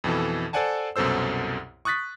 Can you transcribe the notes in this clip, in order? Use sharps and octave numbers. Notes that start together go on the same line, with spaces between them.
F2 B2 E3 A4
A4 C5 D5 F#5 G#5 A5
C2 F#2 B2 A4 C5 E6
C#6 D#6 F#6 A6 B6